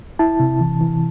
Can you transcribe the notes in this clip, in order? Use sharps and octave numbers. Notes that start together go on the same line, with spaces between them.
E4 A5
C3
E3
E3